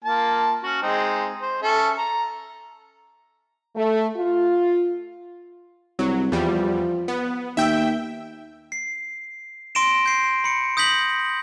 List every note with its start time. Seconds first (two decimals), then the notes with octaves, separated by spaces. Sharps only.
0.05 A#3 F4 A5
0.63 C#4 F#4
0.82 G#3 C4 D#4
1.41 C5
1.62 C#4 A4 E5
1.97 A#5
3.76 A3
4.17 F4
5.99 C2 F#3
6.32 E2 F3 G3
7.08 B3
7.57 D#2 E5 G5
8.72 C7
9.75 C6 A#6 D7 E7
10.06 G6 C7
10.44 B5 C#7
10.77 D#6 G6 A#6 B6 F#7